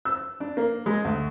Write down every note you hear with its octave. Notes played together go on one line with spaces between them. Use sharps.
E6
D4
A#3
G#3
D2